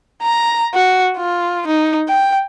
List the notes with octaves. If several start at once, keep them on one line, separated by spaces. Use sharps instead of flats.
A#5
F#4
F4
D#4
G5